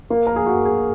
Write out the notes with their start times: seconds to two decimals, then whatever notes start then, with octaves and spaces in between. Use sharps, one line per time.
0.10 A#3
0.27 A#4
0.36 G#4
0.46 F#4
0.65 G#4